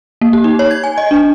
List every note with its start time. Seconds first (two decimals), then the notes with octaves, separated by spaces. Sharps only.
0.22 A#3
0.33 G4
0.44 D#4
0.59 C#5
0.71 G#6
0.84 G#5
0.98 D#5
1.11 D4